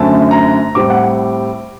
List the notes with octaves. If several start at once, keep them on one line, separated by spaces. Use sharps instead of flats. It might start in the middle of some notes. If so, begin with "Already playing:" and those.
Already playing: F#2 D3 A3 C4 A5
A#5
A2 G3 C4 D6
F#5